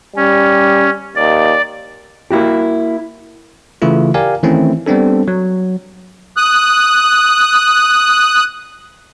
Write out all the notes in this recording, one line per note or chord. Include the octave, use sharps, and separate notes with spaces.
G3 C#4
D#2 D5
A#3 E4 F#4 G4
C#3 E3 A3 E4 F4
G4 A#4 D5 F5 G#5
D#3 E3 A3 C4 C#4 E4
G3 B3 C4 D4 A4
F#3
D#6 F#6